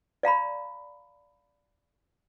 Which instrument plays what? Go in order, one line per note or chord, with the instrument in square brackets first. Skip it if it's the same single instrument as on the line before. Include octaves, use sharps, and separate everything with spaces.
[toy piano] D5 F5 A#5 B5